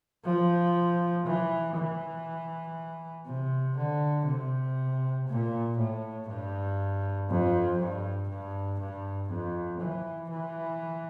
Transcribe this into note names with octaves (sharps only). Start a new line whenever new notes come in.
F3
E3
E3
C3
D3
C3
A#2
A2
G2
F2
G2
G2
G2
F2
E3
E3